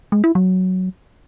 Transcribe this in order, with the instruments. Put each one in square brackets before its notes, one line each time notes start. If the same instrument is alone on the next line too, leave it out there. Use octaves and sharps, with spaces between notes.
[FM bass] G#3
E4
F#3